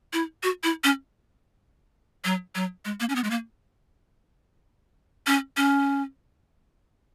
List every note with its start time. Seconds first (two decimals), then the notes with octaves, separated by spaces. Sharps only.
0.13 E4
0.43 F#4
0.64 E4
0.84 C#4
2.25 F#3
2.55 F#3
2.85 G#3
3.00 A#3
3.09 C#4
3.16 B3
3.24 G#3
3.31 A#3
5.27 C#4
5.57 C#4